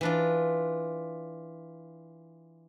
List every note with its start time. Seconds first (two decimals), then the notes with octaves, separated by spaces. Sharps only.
0.01 E3 D4 F4